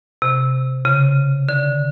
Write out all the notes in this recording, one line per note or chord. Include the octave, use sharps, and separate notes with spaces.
C3
C#3
D3